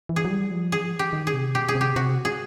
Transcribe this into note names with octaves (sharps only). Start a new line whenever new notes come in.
E3
G#4
F#3
G3
F3
E3 G#4
F3
E3
G4
D#3
G#4
C3
B2 G4
G#4
C3
G4
C3 F#4
G#4